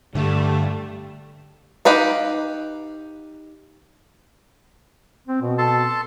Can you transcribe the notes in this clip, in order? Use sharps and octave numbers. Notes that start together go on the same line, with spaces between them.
G2 D3 G3 A3
D#4 G4 B4 F5
C4
B2
A4 A5 C6